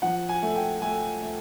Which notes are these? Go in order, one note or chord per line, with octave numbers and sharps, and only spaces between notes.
F3 F#5
G#5
A3
G5
A3 G#5
A3